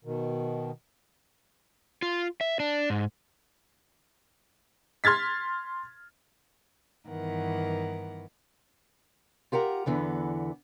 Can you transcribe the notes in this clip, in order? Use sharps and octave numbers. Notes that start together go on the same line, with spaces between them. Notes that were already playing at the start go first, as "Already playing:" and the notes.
B2 D#3
F4
E5
D4
G#2
C6 F6 G#6 A6 B6
G2 D#3 E3 B3 A#4 F#5
F4 G4 A#4 F#5 A#5
E2 D3 E3 B3